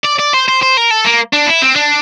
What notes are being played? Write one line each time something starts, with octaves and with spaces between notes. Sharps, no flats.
D5
D5
C5
C5
C5
A#4
A4
A#3
D4
E4
C4
D4